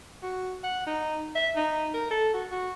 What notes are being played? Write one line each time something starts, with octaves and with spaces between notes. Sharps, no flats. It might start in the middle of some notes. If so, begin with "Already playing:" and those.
F#4
F#5
D#4
E5
D#4
A#4
A4
F#4
F#4